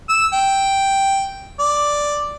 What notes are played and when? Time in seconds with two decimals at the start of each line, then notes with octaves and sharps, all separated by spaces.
0.09 E6
0.33 G5
1.59 D5